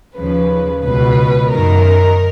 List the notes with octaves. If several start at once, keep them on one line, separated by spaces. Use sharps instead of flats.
D#2 C#3 F3 B4
C#2 B2 B4
F#2 D#3 A#4